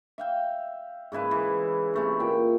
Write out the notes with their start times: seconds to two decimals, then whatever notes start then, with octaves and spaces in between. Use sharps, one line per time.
0.18 E5 F5 G5
1.12 G#2 C#3 E4 B4
1.31 E3
1.94 C3 A3 C#4
2.20 A#2 G5